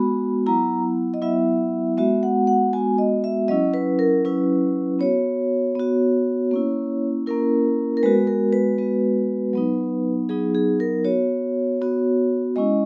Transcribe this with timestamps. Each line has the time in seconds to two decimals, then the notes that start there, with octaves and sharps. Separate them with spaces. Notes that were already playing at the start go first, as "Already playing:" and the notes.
Already playing: G#3 B3 F#4 B5
0.46 F#3 B3 E4 A#5
1.14 D#5
1.22 F#3 B3 E4 E5
1.98 G#3 B3 F#4 E5
2.23 F#5
2.47 F#5
2.73 G#3 B3 F#4 G#5
2.98 D#5
3.24 E5
3.48 F#3 C#4 E4 D#5
3.74 B4
3.99 A#4
4.25 F#3 C#4 E4 B4
4.99 B3 F#4 C#5
5.75 B3 F#4
6.51 A#3 C#4 E4
7.26 A#3 C#4 E4 A#4
7.97 A#4
8.03 G#3 B3 F#4 B4
8.27 A#4
8.53 B4
8.78 G#3 B3 F#4
9.53 F#3 B3 D#4
10.29 F#3 B3 D#4 G#4
10.55 G#4
10.80 A#4
11.05 B3 F#4 C#5
11.81 B3 F#4
12.56 G#3 C#4 E4 D#5